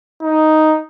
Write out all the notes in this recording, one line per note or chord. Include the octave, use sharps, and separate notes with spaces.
D#4